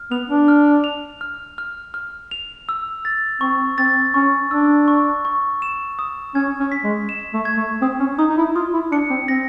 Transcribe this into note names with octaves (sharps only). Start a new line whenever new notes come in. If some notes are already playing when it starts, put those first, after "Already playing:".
Already playing: F6
B3 F7
D4
F6
F7
F6
F6
F6
F7
E6
A6
C4 C#6
C4 A6
C#4 C#6
D4 E6
C#6
C#6
E7
D#6
C#4 G#6
C#4
B6
G#3
E7
A3
G#6
A3
C4 D#6
C#4
D#4 D#6
D#4
E4
F4 D#6
E4
D4 C#7
C4
C4 A#6